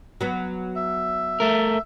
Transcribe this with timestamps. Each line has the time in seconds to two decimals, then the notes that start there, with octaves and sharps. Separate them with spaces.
0.21 F#3 B3
0.76 E5
1.40 A3 A#4